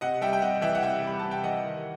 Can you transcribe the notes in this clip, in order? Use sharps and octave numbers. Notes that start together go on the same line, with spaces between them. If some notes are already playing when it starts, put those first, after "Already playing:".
C3 D#5 F#5
G3 E5 G5
G5
C3 D#5 F#5
E3 E5 G5
F#5
C3 E5 G5
G3 B5
C3 A5
G5
E3 D#5 F#5
D#3